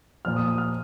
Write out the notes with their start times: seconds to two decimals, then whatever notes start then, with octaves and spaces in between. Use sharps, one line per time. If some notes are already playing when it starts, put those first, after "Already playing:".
0.25 A#2 F3 F6
0.36 D#6
0.48 D#6
0.58 F6